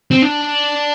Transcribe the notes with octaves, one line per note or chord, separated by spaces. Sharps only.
C4
D4